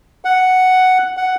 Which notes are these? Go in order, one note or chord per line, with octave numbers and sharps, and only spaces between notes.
F#5
F#5